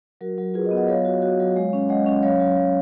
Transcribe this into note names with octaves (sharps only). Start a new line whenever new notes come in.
F#3 F#4 A#4
F#3
F4 G#4 B4
B4 D#5
B3
D#5 F#5
F#3 C#5 F5
F#4
F#4
F#3
G#3
C#4
G#3 D#5 F#5
C#4
F#3 C#5 F5
F#3
F#3